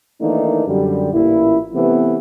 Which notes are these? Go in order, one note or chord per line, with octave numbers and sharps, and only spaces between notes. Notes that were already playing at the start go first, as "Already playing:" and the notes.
D#3 E3 A3 A#3 D4 D#4
F#2 D3 G3
A1 A#2 E4
C3 E3 A3 B3